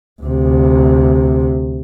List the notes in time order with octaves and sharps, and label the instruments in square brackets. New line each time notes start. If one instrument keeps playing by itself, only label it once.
[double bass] D2 C3